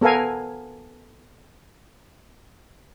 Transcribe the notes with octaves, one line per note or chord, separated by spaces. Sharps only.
B3 A4 A#4 F5 G#5